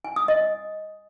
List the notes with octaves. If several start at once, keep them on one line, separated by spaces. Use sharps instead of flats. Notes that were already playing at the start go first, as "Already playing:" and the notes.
G#5
D#6
D#5